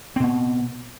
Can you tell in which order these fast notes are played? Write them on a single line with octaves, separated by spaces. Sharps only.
C4 B2 B3